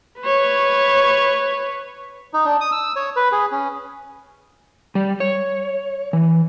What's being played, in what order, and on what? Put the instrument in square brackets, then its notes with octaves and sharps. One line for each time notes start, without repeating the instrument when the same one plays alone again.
[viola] B4 C#5
[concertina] D#4
D4
D#6
E6
C#5
B4
G#4
C#4
[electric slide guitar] G3
C#5
E3